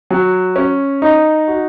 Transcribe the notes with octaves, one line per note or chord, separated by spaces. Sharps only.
F#3
C#4
D#4
F#4